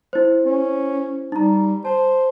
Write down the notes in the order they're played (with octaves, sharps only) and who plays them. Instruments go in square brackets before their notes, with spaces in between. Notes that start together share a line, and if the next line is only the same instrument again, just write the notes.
[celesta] E4 C5
[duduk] C#4
[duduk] G3 [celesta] D#4 A#5
[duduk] C5 [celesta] A5